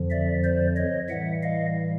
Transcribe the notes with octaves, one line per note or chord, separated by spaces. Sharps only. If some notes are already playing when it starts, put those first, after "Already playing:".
Already playing: F2 D3 F3
D5 E5
C5 D5
C#5 D#5
A2 E3 G3 E5 F#5
D#5 F5